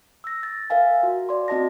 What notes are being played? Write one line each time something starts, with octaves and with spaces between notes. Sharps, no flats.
E6 A#6
A6
A#4 E5 F5 G#5
F#4
D5 C6
C4 F#4 D#5 A5 A#6